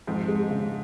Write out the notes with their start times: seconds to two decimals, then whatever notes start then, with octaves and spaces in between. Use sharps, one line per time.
0.07 F2 G#2
0.28 G#3
0.50 C#3